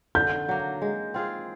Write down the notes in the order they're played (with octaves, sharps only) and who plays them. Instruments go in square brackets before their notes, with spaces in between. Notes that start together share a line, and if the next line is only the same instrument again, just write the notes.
[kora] D3 [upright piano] G6
[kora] F#3 A#3
G#3
C4 F4 G#4